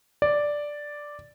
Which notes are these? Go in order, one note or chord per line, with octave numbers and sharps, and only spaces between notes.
D5